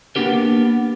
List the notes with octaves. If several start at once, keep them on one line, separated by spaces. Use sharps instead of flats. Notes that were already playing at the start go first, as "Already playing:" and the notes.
A#3 B3 D4 G4 A#4